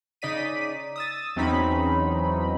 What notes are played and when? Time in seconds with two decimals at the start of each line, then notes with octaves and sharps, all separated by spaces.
0.22 C#3 D#4 D5 B6 D#7
0.96 D#6 E6 A6
1.36 E2 F#3 C4 C#4 D#4 B5